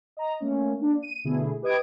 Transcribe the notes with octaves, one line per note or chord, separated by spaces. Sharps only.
D#5 A#5
A3 A#3 C#4
A#3 D4
D#7
B2 D3 A3 E4 G#4
G4 B4 D#5 D#6 G#6 D7